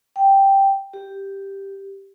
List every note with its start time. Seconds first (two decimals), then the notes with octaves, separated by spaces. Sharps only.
0.16 G5
0.93 G4